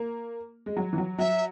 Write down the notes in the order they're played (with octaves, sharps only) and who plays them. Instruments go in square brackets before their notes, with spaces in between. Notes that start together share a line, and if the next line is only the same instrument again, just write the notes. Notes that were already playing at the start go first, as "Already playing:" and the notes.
Already playing: [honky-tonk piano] A#3
G#3
F#3
E3
F#3
[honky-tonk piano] F#3 [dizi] E5